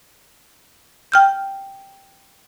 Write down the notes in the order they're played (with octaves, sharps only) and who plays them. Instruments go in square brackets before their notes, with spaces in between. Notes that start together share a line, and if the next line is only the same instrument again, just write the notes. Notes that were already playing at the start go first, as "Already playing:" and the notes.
[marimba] G5 F6 G6